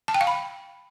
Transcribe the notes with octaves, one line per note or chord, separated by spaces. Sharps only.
A5
G5
F5
B5